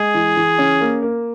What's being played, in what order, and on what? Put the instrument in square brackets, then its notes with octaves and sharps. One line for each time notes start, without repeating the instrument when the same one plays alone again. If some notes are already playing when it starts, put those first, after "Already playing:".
Already playing: [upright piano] G#3 [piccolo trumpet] G#4
[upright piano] E3
E3
C#4
A#3
A#3